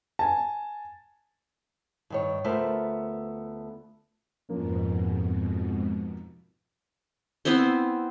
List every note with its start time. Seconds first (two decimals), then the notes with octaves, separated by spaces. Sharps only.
0.19 G#5 A5
2.10 G2 D#3 C#5
2.44 D2 A3 B3 F4 A#4 C5
4.49 F2 G#2 B2 F3 A#3 C#4
7.45 B3 C4 E4 C5